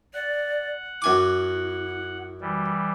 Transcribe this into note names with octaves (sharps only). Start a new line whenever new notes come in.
D5 F#5
F#2 E4 G#5 D6
E3 G3